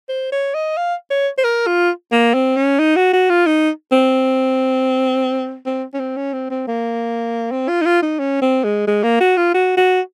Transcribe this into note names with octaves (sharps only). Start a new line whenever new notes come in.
C5
C#5
D#5
F5
C#5
C5
A#4
F4
A#3
C4
C#4
D#4
F#4
F#4
F4
D#4
C4
C4
C#4
C4
C#4
C4
C4
A#3
C4
F4
D#4
F4
D#4
C#4
C4
G#3
G#3
A#3
F#4
F4
F#4
F#4